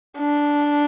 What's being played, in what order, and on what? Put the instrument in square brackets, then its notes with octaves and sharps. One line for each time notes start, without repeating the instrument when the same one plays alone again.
[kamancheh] D4